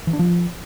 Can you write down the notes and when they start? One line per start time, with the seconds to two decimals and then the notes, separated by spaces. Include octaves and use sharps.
0.07 E3
0.13 D4
0.19 F3